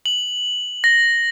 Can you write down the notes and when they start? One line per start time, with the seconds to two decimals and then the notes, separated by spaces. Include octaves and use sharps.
0.06 F#7
0.84 A#6